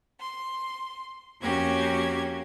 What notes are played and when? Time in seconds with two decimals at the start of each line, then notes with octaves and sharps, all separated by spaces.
0.20 C6
1.41 F2 A#3 C#4 F#4 G4 G#6